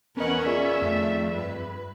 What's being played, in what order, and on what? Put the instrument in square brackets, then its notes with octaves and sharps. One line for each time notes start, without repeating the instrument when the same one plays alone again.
[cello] E2 B4 [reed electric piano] B3 D#5 [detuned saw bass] C#4 [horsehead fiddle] A#4 F#5
[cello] B3 [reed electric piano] F4 G#4 D5 [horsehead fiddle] E5
[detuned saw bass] F2 [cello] D#3 A3
[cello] G2 B4